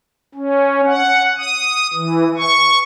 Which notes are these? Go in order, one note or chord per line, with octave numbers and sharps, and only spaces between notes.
C#4
F#5
D#6
E3
C#6